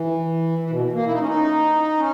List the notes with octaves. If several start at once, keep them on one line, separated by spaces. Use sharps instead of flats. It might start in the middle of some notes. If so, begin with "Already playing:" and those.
Already playing: E3
E3
B2
A#3
E4
D#4
C#4
D#4
C#4